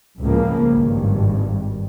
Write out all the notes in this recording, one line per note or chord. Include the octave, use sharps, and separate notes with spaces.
C#2 A2 C#3 F3 A#3
G#1 G2